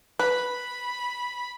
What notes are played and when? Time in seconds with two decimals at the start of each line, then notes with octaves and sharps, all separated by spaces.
0.19 B4 B5